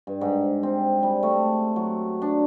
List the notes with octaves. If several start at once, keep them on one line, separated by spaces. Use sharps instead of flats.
G2
G#2
C4
G3
A3
F#3
D4